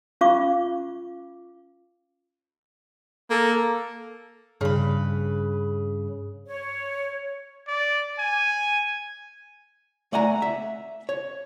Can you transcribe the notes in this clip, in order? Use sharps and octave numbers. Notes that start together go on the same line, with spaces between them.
C#4 F4 F5 C#6 D6
A#3 A4
G2 C#3 B4
C#5
D5
G#5
A3 D5 F#5 G#5 A#5
E5
C#5